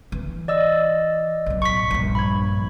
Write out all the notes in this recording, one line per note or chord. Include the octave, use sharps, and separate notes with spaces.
E3
D5 D#5 E6
B1 A2
C#6 B6
A#1 G2
B5 G#6